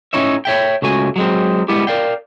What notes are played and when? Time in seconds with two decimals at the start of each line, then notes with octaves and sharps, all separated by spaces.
0.13 A2 C4 C#4 D#4 C#5 E5
0.45 C#5 E5 G5
0.82 C#2 A3 F#4 G#5
1.16 F#3 G#3 C4
1.68 G3 G#3 B3 E4 G4
1.87 A#4 D5 F5 G5